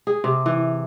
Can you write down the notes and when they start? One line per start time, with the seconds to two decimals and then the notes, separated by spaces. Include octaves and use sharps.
0.07 G#4
0.24 C3
0.46 E3